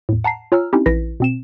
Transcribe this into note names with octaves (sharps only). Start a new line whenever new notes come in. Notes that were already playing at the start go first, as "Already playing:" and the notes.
E2 A2
F#5 A5 A#5 C7
F4 C#5 G#5 A#5 E6 F6
C4 C#4 D#4 E4 G4
A#1 E3 E4 B4 A#6 B6
B2 C4 E7